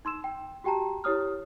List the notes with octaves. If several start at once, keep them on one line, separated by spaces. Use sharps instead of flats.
D#4 C6 E6 E7
G5
F#4 G4 G5 A5 A#5
E4 G4 C#5 D#6 F6